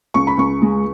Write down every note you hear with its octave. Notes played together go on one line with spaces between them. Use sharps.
C#2 C#6
B5
C#2 C#6
G#3